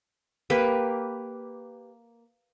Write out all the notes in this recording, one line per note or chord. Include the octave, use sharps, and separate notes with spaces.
A#3 G4 B4